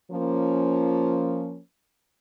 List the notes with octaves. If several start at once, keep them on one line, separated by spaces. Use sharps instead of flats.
F3 A#3 C#4